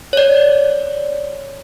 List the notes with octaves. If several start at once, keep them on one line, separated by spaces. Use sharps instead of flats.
C#5 D5